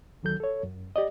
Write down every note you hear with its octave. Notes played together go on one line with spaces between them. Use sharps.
D2 D#3 F#3 A4 G6
A4 C#5
F#2
G4 D5 D#5